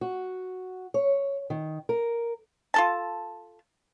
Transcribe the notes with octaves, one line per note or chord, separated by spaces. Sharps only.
F#4
C#5
D#3
A#4
F4 A4 A5